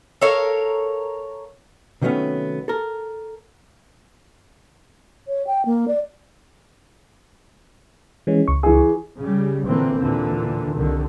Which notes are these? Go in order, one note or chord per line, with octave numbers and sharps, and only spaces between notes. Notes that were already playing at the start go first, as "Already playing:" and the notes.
A4 A#4 C#5 F5
C3 D#3 F#3 A3 B3 C#4
A4 A#4
C#5
G5
A#3
D5
E3 G#3 C#4
C#2 C#6
E3 G#4
C#3 G3
A#2 D3 E3 A#3 C4
D#2 A#2 D3 E3
C2 D3 D#3